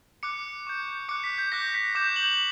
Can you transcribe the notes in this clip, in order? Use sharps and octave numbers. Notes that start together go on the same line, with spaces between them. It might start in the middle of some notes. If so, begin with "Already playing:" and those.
D6 F#6 C#7
C#6 G6
D6 F#6 C#7
B6
G6
D6 F#6 A#6
B6
D6 G6 E7
F#7